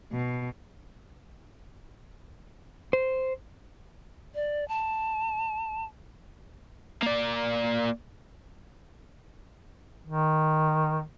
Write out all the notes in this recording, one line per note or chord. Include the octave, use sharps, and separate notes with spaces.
B2
C5
D5
A5
A#3 D5
D#3